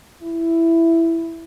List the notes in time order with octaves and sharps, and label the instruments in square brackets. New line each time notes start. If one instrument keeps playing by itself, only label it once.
[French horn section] E4